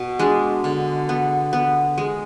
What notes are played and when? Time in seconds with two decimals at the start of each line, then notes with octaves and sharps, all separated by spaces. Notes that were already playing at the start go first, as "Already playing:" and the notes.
Already playing: B2
0.19 G#3 D4
0.64 D3
1.09 B3
1.53 B3
1.98 G#3